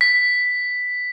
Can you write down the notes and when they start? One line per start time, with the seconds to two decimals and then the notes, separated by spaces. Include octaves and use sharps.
0.01 B6